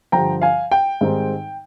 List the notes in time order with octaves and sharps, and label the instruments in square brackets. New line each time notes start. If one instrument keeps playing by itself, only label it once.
[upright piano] G2 D3 F3 G5 A#5
F5 G#5
G5
G#2 D#3 G3 C4 D#4